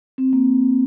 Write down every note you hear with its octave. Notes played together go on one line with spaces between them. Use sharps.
C4
A#3